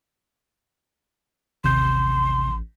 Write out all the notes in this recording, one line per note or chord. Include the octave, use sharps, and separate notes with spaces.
A1 D#2 C3 C6 G6